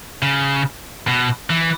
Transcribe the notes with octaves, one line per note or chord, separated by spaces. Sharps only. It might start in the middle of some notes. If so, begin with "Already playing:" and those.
C#3
B2
E3